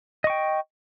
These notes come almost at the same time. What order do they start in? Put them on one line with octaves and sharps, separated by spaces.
D#5 C#6 G5